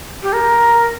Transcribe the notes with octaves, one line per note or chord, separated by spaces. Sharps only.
G4
A#4